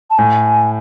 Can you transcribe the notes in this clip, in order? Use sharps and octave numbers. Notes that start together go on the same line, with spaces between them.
A5
A2 G#5